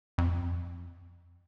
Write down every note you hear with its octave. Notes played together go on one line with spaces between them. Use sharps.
F2